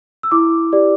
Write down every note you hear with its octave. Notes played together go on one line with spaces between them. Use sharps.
E6
E4 D6
G4 D5